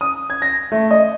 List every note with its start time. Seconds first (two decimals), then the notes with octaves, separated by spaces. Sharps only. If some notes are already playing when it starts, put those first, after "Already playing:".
0.01 D#6
0.30 G#6
0.42 A#6
0.72 A3
0.91 D#5